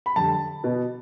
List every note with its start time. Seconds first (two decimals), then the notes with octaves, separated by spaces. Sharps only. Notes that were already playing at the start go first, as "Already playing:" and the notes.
0.06 B5
0.16 F2 D3 G3 A5
0.63 B2 B3